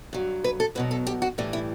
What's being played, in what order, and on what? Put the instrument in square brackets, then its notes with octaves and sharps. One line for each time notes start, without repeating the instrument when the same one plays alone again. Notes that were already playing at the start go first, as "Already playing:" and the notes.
[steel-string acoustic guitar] G2 F#3
B4
A4
E2 B2 F#3 B4
A4
G4
F#4
A2 E3 G3 D4
E4